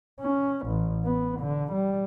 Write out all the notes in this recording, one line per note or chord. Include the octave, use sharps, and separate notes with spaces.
C#4
A1
B3
D3
G3